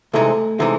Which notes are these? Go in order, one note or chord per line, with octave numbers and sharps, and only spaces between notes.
C2 C3 E3 G#3 A3 D#4
C3 E3 G#3 A3 D#4